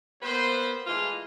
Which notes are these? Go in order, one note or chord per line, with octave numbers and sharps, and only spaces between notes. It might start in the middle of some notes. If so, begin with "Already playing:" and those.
G3 A#3 B3 B4 C5
E3 G#3 A3 F4 D#5